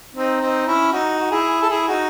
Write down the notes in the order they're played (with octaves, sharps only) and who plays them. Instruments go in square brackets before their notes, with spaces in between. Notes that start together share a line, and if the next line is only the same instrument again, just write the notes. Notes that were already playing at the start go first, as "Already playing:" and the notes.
[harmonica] C4 D#4
C4 D#4
C#4 E4
D#4 F#4
F#4
E4 G#4
A4
E4 G#4
D#4 F#4